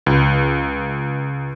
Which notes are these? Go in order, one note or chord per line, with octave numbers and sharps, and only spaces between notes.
C#2